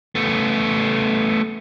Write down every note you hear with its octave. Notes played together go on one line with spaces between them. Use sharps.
A3 B3